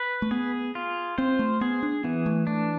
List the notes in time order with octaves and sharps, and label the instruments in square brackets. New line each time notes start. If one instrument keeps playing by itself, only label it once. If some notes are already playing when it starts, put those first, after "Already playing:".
Already playing: [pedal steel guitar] B4
[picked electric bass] A3
[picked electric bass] B3 [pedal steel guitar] G#4
[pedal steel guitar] F4
[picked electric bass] C4 [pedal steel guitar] C5
[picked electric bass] A3
[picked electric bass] B3 [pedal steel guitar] G#4
[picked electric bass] D4
[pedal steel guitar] E3 [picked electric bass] B3
[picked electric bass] A3
[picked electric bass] A3 [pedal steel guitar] D4